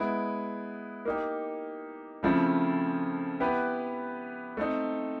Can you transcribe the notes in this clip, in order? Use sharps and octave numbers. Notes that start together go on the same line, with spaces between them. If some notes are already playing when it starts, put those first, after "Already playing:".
Already playing: G#3 B3 E4
A#3 D#4 G4
C#3 F3 A3 C4 E4
B3 E4 G4 B4
A3 C4 D#4